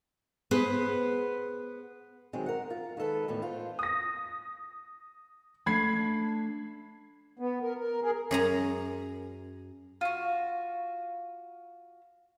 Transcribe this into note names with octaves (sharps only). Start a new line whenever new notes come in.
B3 G#4 B4 C5
D#3 F#3 G#3 C4
A#4 F#5
F4
D#3 G#3 A4 B4
E2 A2 D#3
F4 C5
D#6 A#6
A3 D4 F#5 B5 G#6 C7
B3
A#4
A#4
G#4 A#4
F#2 G#4 A#5
F4 F#4